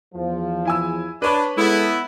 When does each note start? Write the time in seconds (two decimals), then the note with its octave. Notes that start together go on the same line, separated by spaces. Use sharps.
0.15 E2 F3
0.65 E4 G#5 E6
1.22 D4 B4 C#5 B5
1.57 G#3 B3 E4 A4